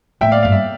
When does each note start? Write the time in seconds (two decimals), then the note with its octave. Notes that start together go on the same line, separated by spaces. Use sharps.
0.21 A2 E5 G5
0.32 D5 F5
0.43 G2 F5
0.52 E5